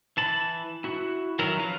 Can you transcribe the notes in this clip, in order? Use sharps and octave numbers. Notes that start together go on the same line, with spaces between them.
E3 A5 B5
E4 F#4
D#3 F#3 E4 A#4 A#5
F3 F#3 C#4 B4 F5